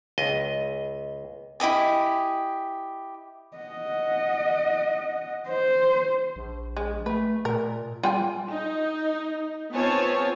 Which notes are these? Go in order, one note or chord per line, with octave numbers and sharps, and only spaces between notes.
C#2 D#5
E4 G4 D#5 G#5
D#5 F#5
C5
A#1
G#3
A3 B4
A#2 A#4
G3 F4 G5 G#5
D#4
B3 C4 F4 C#5 G#5 A5